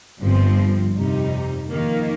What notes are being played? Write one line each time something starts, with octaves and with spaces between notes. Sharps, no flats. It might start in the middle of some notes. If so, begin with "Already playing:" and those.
G1 G2 F3 C4
F2 C3 G3 D#4
F2 D#3 A#3